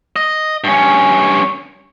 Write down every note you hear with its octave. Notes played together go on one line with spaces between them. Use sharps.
D#5
G2 C#4